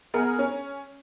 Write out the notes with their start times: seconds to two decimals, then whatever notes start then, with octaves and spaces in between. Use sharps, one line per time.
0.14 B3 G#4 A#4
0.39 C#4